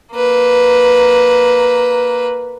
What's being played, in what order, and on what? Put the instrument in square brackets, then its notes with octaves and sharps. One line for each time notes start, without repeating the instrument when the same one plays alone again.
[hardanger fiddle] A#3 B4